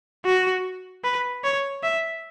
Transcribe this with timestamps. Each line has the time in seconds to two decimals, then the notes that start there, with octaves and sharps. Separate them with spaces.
0.25 F#4
1.04 B4
1.44 C#5
1.83 E5